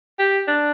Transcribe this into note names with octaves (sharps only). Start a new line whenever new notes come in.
G4
D4